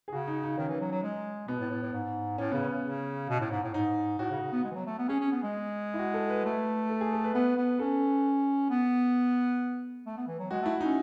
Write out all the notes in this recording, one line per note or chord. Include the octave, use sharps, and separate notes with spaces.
G#4
C#3 F#4
D#4
D#4
D#3 C#4
E3
F#3
F#3
G#3
B2 B3
A2
A2
A2
G#2
A2 C#4
C#3 B3
C#4
C#3
B2
A2
G#2
A2
G#2 D#4
A2 F#4
C#3
C#3
B3
G#3
E3
F#3
A3
B3
C#4 G#4
C#4
B3
G#3
E4
F#4
A4
B4
A3 B4
A4
G#4
A4
B4
B3 B4
B3
C#4 A4
B3
A3
B3
E3
F#3
G#3 F#4
A3 E4
D#4
C#4